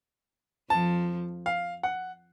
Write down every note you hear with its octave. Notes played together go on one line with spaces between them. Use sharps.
F2 F3 A5
F5
F#5